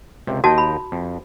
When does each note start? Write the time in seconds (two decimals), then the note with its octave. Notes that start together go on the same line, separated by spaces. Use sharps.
0.27 C#2 C3
0.44 D#2 F#4 D#5 G5 A5
0.58 B5
0.92 F2